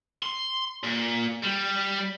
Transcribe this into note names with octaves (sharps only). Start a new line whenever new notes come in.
C6
A#2
G3